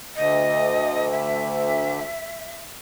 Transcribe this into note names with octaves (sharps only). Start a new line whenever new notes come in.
D2 D#5
E5